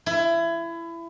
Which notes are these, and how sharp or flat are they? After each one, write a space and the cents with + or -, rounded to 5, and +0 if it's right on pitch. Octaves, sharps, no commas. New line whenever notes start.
E4 +25